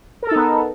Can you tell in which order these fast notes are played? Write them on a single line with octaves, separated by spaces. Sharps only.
A#4 A4 D#4 B3